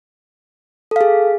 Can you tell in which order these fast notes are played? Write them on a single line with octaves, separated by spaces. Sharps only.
A4 F5 G#4